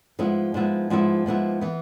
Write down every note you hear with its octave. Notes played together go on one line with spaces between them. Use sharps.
G#2 F3 B3 E4
G#2 F3 B3 E4
G#2 F3 B3 E4
G#2 F3 B3 E4
E3 B3